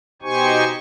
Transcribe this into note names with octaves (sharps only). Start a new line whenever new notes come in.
B2 D#4 G4 C5 G#5 C#6